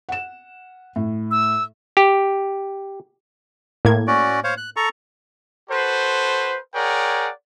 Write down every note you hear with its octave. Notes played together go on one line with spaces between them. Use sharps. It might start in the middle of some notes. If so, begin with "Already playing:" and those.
F#5 E7
A2
E6
G4
A2 A#3 G#6
C#4 F#4 D5
C5 C#5 F5
F#6
A4 A#5 C#6
F#4 A4 B4 C5
G#4 A#4 C#5 D5 F#5 G5